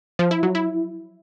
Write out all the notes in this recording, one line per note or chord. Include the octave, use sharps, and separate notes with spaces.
F3
E4
F#3
E4